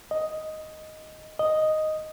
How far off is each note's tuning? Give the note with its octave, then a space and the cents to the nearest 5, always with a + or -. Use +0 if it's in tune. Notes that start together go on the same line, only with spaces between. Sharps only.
D#5 +5
D#5 +0